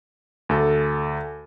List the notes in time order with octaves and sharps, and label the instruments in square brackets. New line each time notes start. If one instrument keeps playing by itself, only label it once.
[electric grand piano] D2 A4